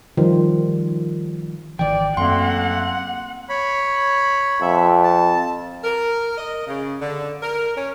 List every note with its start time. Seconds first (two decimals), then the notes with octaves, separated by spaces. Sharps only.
0.17 D#3 F3 G3 F4
1.79 G#1 D#3 E3 D5 G5
2.17 F#2 A3 A#3 C4 F#5 C6
3.49 C#5 B5
4.62 F2 E5
5.03 A5
5.84 A#4
6.38 D#5
6.67 C#3
7.01 D3
7.42 A#4
7.76 C#4